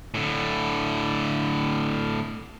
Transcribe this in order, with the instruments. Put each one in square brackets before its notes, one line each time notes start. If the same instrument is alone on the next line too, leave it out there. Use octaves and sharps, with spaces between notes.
[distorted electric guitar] A2 D3